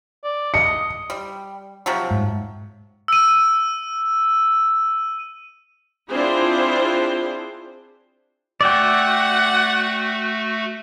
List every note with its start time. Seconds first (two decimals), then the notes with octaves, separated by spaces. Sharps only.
0.24 D5
0.54 D#5 C#7
1.10 G3
1.86 C3 F3 F#3
2.11 G#2
3.08 E6 D#7
6.10 C4 D4 E4 F4 G#4 C5
8.61 A3 F#4 D5 E5 F#5 G5